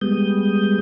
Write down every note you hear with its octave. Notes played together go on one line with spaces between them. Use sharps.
G3 G#3 B3 D#6 G6